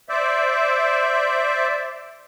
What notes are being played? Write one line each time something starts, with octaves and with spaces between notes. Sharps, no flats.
C5 D5 E5